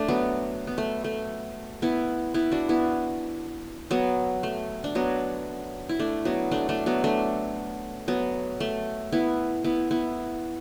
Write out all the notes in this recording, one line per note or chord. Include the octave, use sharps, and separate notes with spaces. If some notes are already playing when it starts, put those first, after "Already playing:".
Already playing: A3 D4
F#3 B3
B3
A3
A3
B3 E4
B3 E4
D4 F#4
B3 E4
F#3 B3
A3
D4
F#3 B3
E4
A3 D4
F#3 B3
A3 D4
A3 D4
F#3 B3
A3 D4
F#3 B3
A3
B3 E4
B3 E4
B3 E4